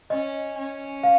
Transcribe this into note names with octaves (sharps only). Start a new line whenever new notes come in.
C#4 D#5
C#4
F5